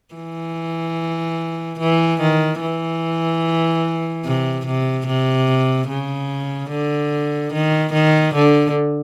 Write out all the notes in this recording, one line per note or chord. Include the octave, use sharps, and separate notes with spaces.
E3
E3
D#3
E3
C3
C3
C3
C#3
D3
D#3
D#3
D3